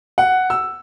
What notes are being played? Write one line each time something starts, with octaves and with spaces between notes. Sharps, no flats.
F#5
E6